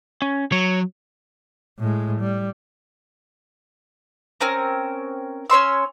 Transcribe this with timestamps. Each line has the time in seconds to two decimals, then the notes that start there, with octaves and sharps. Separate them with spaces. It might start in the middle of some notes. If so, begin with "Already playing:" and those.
0.22 C#4
0.52 F#3 C#5
1.79 A2 G#3
2.21 G3
4.41 C4 C#4 A#4
5.50 C#4 C#5 C6 E6